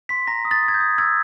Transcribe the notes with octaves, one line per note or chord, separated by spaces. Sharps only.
C6 B6
A#5 A#6
D#6
A6
D#6
G#6
G6
D#6
E6 G#6